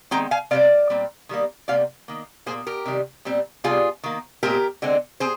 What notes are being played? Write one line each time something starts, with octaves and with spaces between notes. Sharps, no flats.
D#3 G#3 C4 G5 A#5
F5 G#5
C3 G3 C4 D5 F5
A#2 G3 C4
D#3 G3 A#3
C3 G3 A#3 D5 F5
D#3 A#3
A#2 F3 A#3 G#4 C5
G4 A#4
C3 D#3 G3
A#2 G3 C4
C3 G3 C4 F4 G#4
D#3 A#3
A#2 G#3 C4 G4 A#4
D3 G#3 C4
C4 G#4 C5